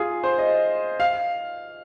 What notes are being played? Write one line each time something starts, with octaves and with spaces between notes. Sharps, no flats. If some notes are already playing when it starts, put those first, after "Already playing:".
Already playing: F4 G#4
C5
D#5
F5